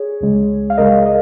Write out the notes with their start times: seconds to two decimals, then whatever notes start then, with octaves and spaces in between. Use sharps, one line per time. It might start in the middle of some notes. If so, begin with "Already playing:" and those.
Already playing: G#4 C#5
0.21 C#2 C#3 G#3
0.70 F5
0.77 C#2 C#3 G#3 A#4 D#5
1.06 A#4 D#5